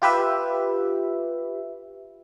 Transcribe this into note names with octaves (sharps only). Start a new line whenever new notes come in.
F4 G4 B4 E5